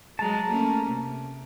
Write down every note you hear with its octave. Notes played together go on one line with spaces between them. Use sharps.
F#3 G#3 A5 A#5
A3 A#3 C#4
C3